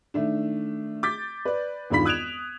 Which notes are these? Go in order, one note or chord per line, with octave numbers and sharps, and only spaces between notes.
D#3 A3 D4
D6 G6 A6 B6
B4 D5
E1 G2 D#3 F4 B5 B6
D#6 F#6 G#6 D7 E7 F7